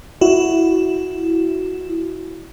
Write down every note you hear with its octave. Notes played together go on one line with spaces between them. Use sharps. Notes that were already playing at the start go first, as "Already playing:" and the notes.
E4 F#4